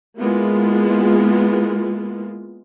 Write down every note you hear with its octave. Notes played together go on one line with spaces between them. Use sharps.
G#3 A#3 B3 E4 F4